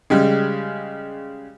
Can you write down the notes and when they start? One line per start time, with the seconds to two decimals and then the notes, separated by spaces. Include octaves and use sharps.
0.10 C#3 G3 G#3